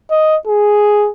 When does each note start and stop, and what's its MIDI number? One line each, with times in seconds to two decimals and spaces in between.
0.11 0.36 75
0.47 1.09 68